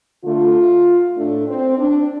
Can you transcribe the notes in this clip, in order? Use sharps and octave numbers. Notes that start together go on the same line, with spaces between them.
D3 A3 F4
A2 A3 D4
C4
D4